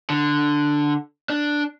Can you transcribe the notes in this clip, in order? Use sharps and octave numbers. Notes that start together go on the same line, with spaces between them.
D3
D4